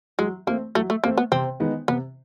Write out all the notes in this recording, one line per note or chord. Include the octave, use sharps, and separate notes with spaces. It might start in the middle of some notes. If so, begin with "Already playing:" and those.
F#3 G#3
A3 A#3 C4
F#3 A3
A3
A3 A#3 C4
B3
C3 C4
D#3 G#3 B3 D#4
C3 B3